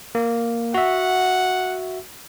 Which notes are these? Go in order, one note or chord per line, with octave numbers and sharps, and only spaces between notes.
A#3
F#4 E5 F#5